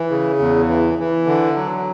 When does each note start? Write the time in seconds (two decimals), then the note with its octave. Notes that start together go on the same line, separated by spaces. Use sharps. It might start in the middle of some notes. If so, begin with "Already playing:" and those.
Already playing: E3
0.10 C#3
0.39 E2
0.68 E3
0.98 E3
1.27 D3
1.56 F#3